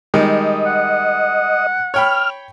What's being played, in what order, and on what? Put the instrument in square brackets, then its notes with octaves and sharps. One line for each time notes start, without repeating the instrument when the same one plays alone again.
[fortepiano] D#3 G3 G#3 [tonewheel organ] D#5
[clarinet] F#5
[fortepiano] C#5 G5 B5 [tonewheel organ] F6